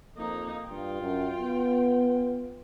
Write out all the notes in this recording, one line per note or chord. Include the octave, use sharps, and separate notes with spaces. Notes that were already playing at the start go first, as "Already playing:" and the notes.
F2 A#3 D#4
G2 F4 G5
F#2
B3